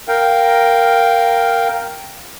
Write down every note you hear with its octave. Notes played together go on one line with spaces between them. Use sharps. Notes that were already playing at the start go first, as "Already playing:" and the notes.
A#4 F5 G5